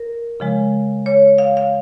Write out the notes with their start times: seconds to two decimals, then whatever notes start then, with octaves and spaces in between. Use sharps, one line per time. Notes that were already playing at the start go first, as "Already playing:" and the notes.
Already playing: A#4
0.40 C#3 F3 G#3
1.06 C#5
1.38 F5
1.57 F5